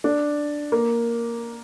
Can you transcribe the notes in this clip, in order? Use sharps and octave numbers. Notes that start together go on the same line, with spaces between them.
D4
A#3